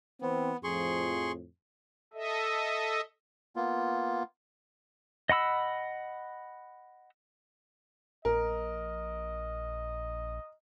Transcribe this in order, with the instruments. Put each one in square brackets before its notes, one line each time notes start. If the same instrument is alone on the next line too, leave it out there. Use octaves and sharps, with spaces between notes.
[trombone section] E3 C4 [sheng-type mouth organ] B3
[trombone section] F2 A2 F3 [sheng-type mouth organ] G#4 C6 C#6
[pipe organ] A4 D#5 E5
[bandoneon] A#3 B3 F4
[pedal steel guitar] D#5 F#5 B5 E6
[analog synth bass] A#1 [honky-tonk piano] A#4 [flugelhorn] D#5